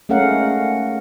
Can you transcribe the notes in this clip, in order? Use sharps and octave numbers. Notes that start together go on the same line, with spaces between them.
G#3 A3 C#4 A#4 F5 F#5